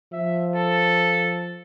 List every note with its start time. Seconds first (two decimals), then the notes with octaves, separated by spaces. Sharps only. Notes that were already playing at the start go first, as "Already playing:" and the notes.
0.13 F3 E5
0.54 A4